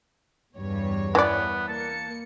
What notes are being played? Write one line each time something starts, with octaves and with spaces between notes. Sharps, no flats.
E2 G2 C#5
E3 B3 D5
A#3 A5 C#7